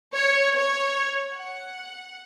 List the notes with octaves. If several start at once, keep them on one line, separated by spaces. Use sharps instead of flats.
C#5
C#5
F#5